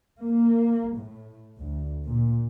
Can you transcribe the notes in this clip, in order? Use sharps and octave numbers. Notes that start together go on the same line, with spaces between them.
A#3
A2
D2
A#2